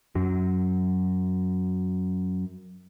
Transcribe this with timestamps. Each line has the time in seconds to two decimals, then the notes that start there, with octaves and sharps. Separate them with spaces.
0.15 F#2 F#3